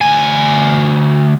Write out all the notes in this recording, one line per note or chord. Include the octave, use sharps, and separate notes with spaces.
D2 G#5